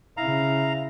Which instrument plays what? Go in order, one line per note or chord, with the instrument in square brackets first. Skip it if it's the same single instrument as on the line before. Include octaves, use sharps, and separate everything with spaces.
[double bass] C#3 E4 [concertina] F5 A#5